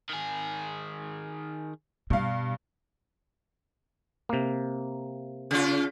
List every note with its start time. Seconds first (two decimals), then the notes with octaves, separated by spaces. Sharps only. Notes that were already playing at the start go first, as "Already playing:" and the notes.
0.09 D#3 G#4
2.10 G2 B2 F5
4.29 C3 A#3
5.51 C#3 F4